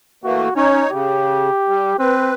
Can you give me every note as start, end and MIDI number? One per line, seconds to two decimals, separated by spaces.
0.24 0.49 52
0.24 0.49 57
0.24 0.49 58
0.24 0.55 66
0.56 0.83 61
0.56 0.90 63
0.56 0.90 73
0.91 1.50 49
0.91 1.95 67
1.68 1.93 55
1.99 2.34 60
1.99 2.34 71